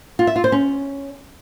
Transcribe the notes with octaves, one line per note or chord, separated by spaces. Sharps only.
F4
E5
F4
C5
C#4